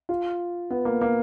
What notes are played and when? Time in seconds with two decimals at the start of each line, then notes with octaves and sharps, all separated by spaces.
0.09 F4
0.70 B3
0.85 A#3
1.01 A#3